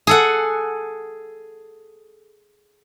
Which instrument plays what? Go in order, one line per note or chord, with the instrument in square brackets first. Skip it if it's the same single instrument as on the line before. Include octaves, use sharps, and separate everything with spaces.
[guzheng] G#4 A4 F#5